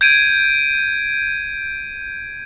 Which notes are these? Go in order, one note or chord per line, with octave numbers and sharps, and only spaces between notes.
G6 G#6 D7 D#7